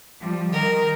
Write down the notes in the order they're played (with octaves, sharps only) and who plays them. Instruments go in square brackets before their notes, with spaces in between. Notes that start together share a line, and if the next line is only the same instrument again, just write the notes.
[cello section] F3 G3
[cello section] D#3 [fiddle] A#4